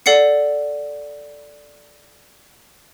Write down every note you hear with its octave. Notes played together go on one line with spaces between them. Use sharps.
A4 D5 F#5 C7 C#7